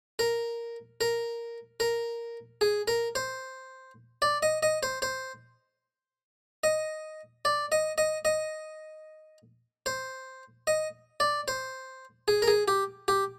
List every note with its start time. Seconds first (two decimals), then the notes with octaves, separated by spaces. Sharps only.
0.19 A#4
1.01 A#4
1.80 A#4
2.61 G#4
2.88 A#4
3.15 C5
4.22 D5
4.43 D#5
4.63 D#5
4.83 C5
5.02 C5
6.64 D#5
7.45 D5
7.72 D#5
7.98 D#5
8.25 D#5
9.86 C5
10.67 D#5
11.20 D5
11.48 C5
12.28 G#4
12.42 A#4
12.48 G#4
12.68 G4
13.08 G4